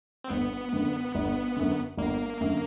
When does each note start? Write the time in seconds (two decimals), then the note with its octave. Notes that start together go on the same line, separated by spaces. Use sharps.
0.24 C4
0.30 G1 B3
0.72 F#2 D3
1.15 G1
1.56 F#2 D3
1.97 G1 A#3
2.41 F#2 D3